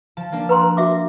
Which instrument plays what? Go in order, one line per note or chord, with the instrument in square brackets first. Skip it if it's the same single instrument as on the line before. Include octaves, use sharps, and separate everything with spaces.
[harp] F3 A5
F3 A#3 D4
[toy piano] B4 A#5 C6 [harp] F#5
[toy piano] F#4 E5 D6